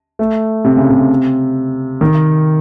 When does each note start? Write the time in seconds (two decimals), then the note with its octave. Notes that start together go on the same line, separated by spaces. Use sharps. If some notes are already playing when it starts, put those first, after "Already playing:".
0.19 A3
0.65 C3
0.77 C#3
0.90 C3
2.01 D#3